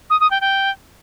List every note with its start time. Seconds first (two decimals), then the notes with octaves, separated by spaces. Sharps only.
0.10 D#6
0.20 D#6
0.31 G5
0.41 G5